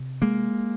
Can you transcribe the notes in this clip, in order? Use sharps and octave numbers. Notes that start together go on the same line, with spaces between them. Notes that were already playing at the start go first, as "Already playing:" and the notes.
Already playing: C3
G#3 A#3